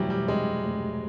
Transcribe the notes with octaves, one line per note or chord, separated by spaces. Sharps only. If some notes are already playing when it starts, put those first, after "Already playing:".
Already playing: F1 C3 E3 F#3 G3
G3
C3 G#3
F1